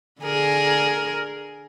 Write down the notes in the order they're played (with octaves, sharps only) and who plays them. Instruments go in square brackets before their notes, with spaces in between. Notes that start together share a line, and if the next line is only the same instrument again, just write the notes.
[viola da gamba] D3 G#4 A#4